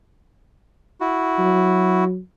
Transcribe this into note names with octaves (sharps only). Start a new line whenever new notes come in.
E4 F#4
F#3